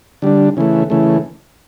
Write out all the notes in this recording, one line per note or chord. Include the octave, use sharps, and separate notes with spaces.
D3 G3 D4
C#3 E3 A3
C#3 E3 A3